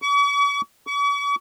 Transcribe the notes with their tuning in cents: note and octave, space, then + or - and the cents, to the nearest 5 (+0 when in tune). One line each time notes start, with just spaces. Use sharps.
C#6 +45
C#6 +45